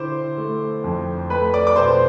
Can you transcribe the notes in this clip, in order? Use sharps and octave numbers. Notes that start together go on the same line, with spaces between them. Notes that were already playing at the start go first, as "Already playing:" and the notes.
Already playing: D3 E4 C5 C6 D6
A3
F2
A3 B4 B5
D5 D6
D6
B2 C5 C6